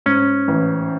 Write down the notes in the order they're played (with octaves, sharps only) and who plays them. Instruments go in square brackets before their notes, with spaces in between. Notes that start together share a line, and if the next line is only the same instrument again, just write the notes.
[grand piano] G#2 [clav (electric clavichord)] C#4
[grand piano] A1